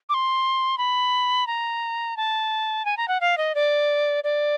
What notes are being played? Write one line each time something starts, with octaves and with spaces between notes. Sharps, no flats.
D6
C6
B5
A#5
A5
G#5
A#5
F#5
F5
D#5
D5
D5